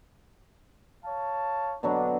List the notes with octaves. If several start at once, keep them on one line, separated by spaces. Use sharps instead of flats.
C#5 F5 A5
B2 D3 F#3 B3 D4